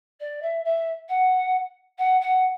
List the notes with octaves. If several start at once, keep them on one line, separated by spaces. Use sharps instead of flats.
D5
E5
E5
F#5
F#5
F#5